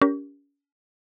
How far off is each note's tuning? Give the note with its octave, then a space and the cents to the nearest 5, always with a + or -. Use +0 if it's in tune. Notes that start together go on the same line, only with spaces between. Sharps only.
C#4 +35 G4 +0 A#4 +5